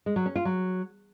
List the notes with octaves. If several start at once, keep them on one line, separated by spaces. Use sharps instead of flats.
G#3
F#3
C#4
F4
F#3